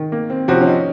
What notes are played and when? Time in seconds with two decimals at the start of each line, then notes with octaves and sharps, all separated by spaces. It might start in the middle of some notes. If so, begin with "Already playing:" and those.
Already playing: D#3
0.12 A#3
0.30 C4
0.48 C3 F3 C4 C#4 F#4
0.61 C#4
0.67 D#4